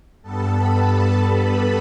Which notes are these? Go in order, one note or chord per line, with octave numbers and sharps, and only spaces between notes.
G2 G3 B3 A4 A5
B4 B5